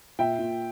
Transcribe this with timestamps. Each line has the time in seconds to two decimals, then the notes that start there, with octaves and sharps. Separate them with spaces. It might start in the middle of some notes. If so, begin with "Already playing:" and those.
0.19 A#2 E5 G5
0.39 A#2